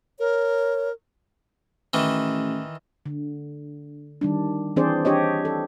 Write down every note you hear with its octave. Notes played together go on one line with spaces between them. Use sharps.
A#4 C#5
A1 D#3 E3
D3
D#3 G3 D4
E3 C4 D4 G#4 C5 D5
D4 G4 C#5 D#5
A4